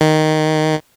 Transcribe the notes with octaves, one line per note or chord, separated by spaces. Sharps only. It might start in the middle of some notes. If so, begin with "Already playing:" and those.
D#3